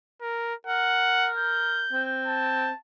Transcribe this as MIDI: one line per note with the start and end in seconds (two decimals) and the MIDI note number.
0.22 0.54 70
0.67 1.83 70
0.67 1.30 78
1.37 2.11 91
1.92 2.68 60
2.27 2.77 81